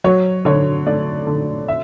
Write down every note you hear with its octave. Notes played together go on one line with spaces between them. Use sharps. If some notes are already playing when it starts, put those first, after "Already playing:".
F#3 C#5
D3 C#5
A3 D5
D3
E5